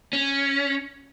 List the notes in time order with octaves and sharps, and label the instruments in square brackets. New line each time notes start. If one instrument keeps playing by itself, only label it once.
[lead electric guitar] C#4